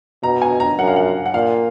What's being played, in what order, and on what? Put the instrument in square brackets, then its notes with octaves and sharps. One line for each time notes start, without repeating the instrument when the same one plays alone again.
[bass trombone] B2 [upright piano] A#5
[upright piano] G#5
A#5
[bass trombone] F#2 [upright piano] F#5
[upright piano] F5
F#5
F#5
[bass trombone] A#2 [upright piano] F5